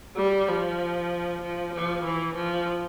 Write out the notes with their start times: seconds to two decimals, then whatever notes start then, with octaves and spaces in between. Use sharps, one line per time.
0.16 G3
0.48 F3
1.42 F3
1.73 F3
2.04 E3
2.35 F3